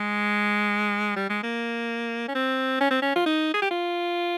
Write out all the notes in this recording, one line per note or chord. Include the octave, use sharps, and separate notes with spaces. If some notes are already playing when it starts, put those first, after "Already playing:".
Already playing: G#3
G3
G#3
A#3
C#4
C4
C#4
C4
C#4
F4
D#4
G#4
G4
F4